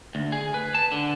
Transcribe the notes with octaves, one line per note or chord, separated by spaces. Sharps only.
D2
G#4
B4
A5
D3